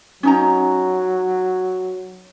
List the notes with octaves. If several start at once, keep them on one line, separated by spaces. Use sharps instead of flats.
F#3 C#4 D#4 A#5